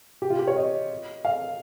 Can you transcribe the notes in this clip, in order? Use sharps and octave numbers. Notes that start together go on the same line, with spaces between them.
G4
F4
G4
C#5
D#5
F5